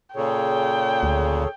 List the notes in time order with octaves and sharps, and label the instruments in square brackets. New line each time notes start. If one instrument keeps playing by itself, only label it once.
[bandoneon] A#2 C#3 [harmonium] G#4 A4 C#5 [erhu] G5
[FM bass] D2